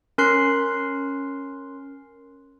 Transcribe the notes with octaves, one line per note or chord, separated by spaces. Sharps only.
C#4 A#4 C6 F#6 C7